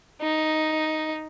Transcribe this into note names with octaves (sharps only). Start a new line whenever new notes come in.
D#4